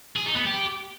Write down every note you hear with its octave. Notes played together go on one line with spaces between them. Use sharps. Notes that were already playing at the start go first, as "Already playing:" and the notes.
G#4
D#4
B3
G4